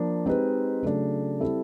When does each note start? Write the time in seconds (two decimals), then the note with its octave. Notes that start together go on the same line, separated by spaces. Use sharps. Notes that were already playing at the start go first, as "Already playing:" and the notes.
Already playing: F3 A#3 D4
0.26 G#3 C4 D#4 G4 B4
0.83 C#3 F#3 A3 D4
1.40 G3 C4 E4 A4